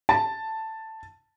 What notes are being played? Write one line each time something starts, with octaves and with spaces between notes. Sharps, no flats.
A5